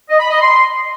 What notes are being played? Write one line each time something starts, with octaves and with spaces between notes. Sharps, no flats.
D#5
B5
D#5
C6